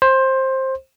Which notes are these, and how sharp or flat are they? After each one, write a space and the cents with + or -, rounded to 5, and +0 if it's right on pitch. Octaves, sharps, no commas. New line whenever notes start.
C5 +15